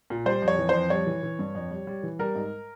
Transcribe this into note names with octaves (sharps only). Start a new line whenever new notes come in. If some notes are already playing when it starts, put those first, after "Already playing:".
A#2
G3 C5
F2
C#5
E3
F2 C5
G3 C#5
E3
E3
G2
F2
G3
G3
E3
G3 A#4
G#2